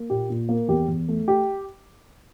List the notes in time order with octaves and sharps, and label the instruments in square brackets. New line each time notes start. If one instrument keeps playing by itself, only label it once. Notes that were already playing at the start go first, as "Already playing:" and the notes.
Already playing: [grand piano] A#3
A#2 G4
A#2
A#3
E2 G4
E2
A3
G4